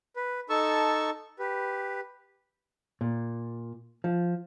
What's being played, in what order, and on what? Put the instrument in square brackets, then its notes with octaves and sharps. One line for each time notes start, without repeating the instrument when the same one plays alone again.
[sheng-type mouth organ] B4
D#4 A4 A5 C#6 E6
G4 B4
[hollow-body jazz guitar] A#2
F3